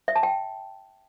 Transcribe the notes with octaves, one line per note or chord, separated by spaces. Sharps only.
E5
A5
G5